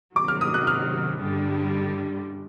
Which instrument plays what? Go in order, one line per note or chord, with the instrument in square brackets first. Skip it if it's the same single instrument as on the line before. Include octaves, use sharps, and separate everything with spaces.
[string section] C3 D#3 F#3 [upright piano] D6
[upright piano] F6
D#6
F#6
F6
[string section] G2 D3 G3